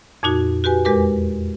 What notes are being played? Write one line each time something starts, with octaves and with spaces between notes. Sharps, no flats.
F2 A#2 D#4 F#4
F#4 G4 B4 G#5
E2 G#3 G4 A#4 B4 D6